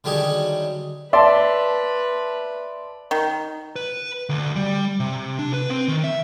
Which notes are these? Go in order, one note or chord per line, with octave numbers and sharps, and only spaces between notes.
D3 D#3 F#3 G3 D#4 G#4
B4 D5 E5 A5 C6
D#3
B4
D2
G3
C3
D4
B4
C4
D#3
E5